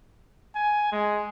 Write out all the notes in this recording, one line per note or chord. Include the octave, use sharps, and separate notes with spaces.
G#5
G#3